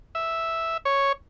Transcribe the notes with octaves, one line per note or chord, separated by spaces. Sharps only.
E5
C#5